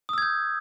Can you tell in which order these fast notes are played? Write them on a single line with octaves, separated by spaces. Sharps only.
D#6 E6 G#6 G6